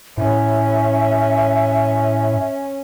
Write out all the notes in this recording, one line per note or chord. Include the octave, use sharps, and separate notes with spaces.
A2 C#4 E5